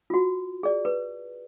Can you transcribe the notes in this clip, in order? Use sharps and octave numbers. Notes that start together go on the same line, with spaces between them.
F4 F#4
G#4 D5
B4